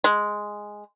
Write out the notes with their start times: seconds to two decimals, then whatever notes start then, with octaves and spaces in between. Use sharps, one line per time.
0.04 G#3